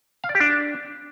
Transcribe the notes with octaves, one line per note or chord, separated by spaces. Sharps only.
F5
D5
G4
D4